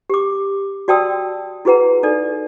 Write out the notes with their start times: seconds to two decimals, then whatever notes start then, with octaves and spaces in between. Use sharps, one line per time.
0.10 G4 D6
0.88 F#4 D5 G5 A5 D#6 E6
1.65 E4 F#4 G#4 B4 F#5 A#5
2.03 D#4 A4 D5